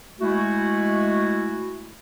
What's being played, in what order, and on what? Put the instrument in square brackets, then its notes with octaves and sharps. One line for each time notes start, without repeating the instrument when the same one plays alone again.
[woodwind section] G#3 A3 E4 F#4